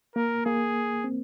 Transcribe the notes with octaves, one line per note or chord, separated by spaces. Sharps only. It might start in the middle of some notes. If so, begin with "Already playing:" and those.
A#3 A#4
A#3 G#4
C4